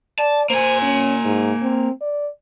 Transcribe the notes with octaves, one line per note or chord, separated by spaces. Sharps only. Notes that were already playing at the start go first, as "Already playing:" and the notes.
D5 A5
A#3 C5 G#5
C#4
G#2
C4
D5